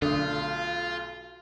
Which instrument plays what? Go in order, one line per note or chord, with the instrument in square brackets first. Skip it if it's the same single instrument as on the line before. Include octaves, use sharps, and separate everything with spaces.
[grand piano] B1 A3 D#6 [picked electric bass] D3 [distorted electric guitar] F4